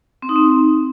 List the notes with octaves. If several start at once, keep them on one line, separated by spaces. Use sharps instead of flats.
C4
D#4
C4